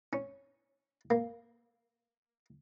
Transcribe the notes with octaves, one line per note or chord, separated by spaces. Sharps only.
C#4
A#3